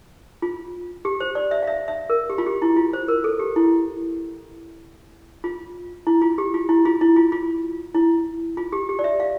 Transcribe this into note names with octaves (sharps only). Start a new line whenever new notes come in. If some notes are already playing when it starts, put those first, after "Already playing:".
F4
G4
C5
D5
E5
F5
E5
E5
A#4
G4
F4
G4
E4
F4
C5
A#4
A4
G4
E4
F4
E4
F4
G4
F4
E4
F4
E4
F4
F4
E4
F4
G4
G4
D5
E5
F5